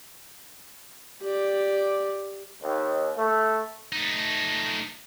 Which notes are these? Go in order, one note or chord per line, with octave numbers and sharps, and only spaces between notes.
G4 D5
D#2
A3
A3 D#4